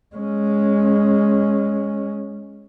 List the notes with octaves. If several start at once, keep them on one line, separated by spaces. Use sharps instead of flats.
G#3 C#4